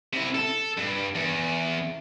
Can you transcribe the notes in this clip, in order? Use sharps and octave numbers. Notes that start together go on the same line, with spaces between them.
C3 E4
A4
G2
E2